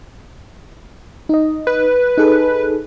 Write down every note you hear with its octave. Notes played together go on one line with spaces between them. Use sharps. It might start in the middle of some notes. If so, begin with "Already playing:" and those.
D#4 D#5
B4
D#4 G#4 A4